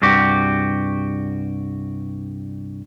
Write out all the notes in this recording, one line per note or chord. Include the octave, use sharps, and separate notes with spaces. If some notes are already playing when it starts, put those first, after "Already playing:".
C2 G2 F#4 G4